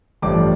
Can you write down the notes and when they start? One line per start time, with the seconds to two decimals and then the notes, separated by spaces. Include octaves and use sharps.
0.22 A1 G2 F3 A3 D5 D6